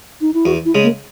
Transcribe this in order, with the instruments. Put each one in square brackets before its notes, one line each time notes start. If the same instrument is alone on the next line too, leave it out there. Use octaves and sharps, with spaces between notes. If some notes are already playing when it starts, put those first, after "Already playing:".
[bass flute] D#4
E4
[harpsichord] E2 [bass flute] F#4
[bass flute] E4
[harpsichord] C#3 G#3
[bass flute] A#3